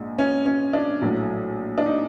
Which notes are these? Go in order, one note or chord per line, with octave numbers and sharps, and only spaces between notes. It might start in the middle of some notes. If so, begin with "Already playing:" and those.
Already playing: A#1 G#2
C#4
C#4
D4
A#1 A2 F#3 A3
D4
D#4